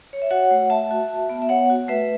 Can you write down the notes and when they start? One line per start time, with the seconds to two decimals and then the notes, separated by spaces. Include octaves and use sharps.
0.13 C#5
0.22 E5
0.31 F#4 C#5 F#5
0.51 A3
0.70 A3 E5 A5
0.91 F#4
1.09 F#4
1.29 B3
1.42 E5
1.49 B3 C#5 F#5
1.70 F#4
1.88 A3 B4 E5